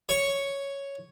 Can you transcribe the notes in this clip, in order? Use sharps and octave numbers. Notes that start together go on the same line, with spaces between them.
C#5 C#6